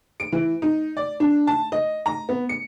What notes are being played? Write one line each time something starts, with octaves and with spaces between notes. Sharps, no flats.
D7
E3
D#4
D5
D4
A5
D#5
A#5
B3
C#7